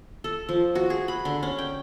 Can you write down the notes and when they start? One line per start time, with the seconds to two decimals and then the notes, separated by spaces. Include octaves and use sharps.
0.24 A4
0.49 F3
0.75 F#4
0.90 G#4
1.08 B5
1.25 D3
1.43 C#4
1.58 G5